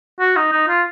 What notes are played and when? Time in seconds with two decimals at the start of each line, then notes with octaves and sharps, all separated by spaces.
0.20 F#4
0.36 D#4
0.52 D#4
0.68 F4